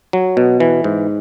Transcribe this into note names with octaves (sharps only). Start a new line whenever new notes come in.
F#3
B2
E3
G#2